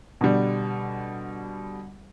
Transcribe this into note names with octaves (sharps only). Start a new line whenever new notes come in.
B2 D3 G3